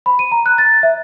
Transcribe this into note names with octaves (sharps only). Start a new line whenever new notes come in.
B5
D#7
A#5
F#6
A6
E5